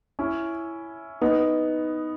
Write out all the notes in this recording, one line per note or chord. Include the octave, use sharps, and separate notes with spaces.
C#4 E4
B3 D#4